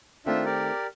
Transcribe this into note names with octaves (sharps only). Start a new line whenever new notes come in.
D#3 A3 C4 D4 F4 E5
G4 A#4 D5